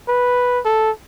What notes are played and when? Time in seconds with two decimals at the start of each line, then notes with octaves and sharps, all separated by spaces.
0.08 B4
0.65 A4